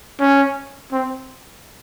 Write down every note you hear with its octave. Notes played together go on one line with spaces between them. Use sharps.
C#4
C4